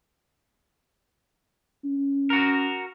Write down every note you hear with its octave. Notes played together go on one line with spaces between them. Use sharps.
C#4
F#4 A#4